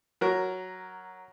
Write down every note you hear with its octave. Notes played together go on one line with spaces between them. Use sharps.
F#3 A#4